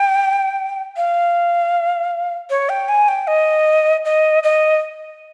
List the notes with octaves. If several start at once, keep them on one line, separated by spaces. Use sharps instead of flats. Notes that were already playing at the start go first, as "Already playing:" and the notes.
Already playing: G5
F5
C#5
G5
G#5
G5
D#5
D#5
D#5